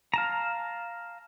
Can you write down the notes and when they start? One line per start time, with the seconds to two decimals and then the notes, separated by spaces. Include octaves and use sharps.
0.14 F5 A5 A#5